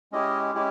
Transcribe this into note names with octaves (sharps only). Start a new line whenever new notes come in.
G#3 C#4 E4 G4 D#5
G#3 C#4 E4 G4